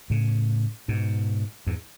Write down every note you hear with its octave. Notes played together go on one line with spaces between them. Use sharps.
A2 C#3
G#2 B2
E2 G#2